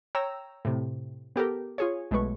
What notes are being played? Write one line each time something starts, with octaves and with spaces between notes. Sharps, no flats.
C#5 G5 A#5 E6
A2 C3
B3 G4 A4 A#4
F4 G#4 C#5
B1 G#3 A3 B4 C#6